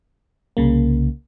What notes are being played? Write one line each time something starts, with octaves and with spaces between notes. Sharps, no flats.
C2 C#3 A#3